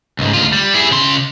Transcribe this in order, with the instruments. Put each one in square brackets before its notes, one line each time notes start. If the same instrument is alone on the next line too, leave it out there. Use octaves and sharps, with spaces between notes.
[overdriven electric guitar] C#2 G#2
D2 F4
G3
E4 G#4
C#3 C6